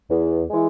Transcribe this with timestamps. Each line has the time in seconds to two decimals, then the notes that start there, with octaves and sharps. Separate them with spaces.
0.09 E2
0.50 E3 G#3